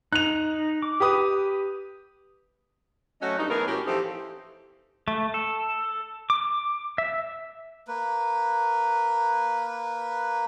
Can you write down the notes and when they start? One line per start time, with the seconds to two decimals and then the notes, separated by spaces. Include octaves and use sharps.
0.12 D#4 F#6 F7
0.82 D6
1.00 G4 B4 D#6
3.21 F#3 A3 C#4 F#4 C#5 D#5
3.38 G2 D#4
3.50 E3 A3 B3 G#4 A#4
3.67 A2 C#4 F#4 G4
3.86 E3 F3 C4 D#4 G4 A4
5.08 A3
5.34 A4
6.30 D6
6.98 E5
7.88 A#3 B4